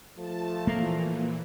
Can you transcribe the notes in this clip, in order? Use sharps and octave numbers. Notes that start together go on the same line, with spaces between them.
F3 A3 A5
A#2 E3 A#3